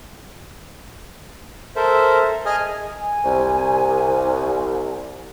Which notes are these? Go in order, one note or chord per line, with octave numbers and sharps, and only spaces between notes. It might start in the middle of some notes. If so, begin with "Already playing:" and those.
A4 A#4 C5 E5
G#4 D#5 G#5 D#6 F6
G#5
C2